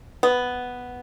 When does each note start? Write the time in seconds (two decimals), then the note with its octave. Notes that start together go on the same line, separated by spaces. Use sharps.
0.23 B3